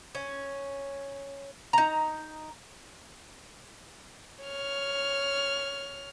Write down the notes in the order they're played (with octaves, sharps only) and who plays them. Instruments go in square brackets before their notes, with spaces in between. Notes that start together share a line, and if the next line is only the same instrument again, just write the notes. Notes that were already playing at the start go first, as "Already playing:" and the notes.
[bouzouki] C#4
D#4 A#5
[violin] C#5 F6